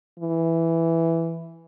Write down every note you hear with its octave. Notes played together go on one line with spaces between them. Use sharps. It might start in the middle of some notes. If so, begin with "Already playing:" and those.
E3